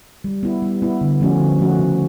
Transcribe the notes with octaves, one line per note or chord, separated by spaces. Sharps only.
G3
B3 E4
G3
B3 E4
D3
F3 A3 C#4 F#4
D3
F3 A3 C#4 F#4
C#3